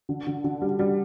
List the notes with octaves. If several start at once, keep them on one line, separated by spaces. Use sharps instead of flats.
D3
D3
D3
G3
G3